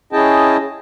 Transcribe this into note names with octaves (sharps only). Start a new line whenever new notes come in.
C#4 E4 G#4 D#5 G5 A5